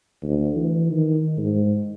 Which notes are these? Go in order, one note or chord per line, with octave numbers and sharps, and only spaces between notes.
D2
E3
D#3
G#2